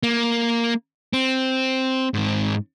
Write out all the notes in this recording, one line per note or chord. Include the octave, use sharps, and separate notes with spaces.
A#3
C4
G#2 C4